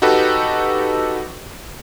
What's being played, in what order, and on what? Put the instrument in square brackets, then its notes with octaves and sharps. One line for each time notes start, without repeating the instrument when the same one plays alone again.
[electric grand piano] D#4 F#4 G4 A4 B4